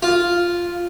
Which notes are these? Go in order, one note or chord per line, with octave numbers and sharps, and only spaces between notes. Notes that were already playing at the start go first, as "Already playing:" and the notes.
F4